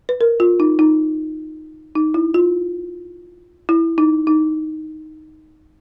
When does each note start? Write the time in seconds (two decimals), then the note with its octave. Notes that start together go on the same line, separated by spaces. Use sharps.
0.09 B4
0.21 A#4
0.40 F4
0.60 D#4
0.79 D#4
1.95 D#4
2.14 E4
2.34 F4
3.69 E4
3.98 D#4
4.27 D#4